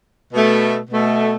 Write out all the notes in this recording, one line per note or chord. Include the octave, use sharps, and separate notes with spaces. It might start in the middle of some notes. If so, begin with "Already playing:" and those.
B2 A3
B2 A3